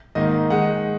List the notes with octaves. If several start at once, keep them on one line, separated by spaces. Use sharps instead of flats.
G#2 D#3 A#3 D#4 D#5
D#3 G#3 D#4 F#5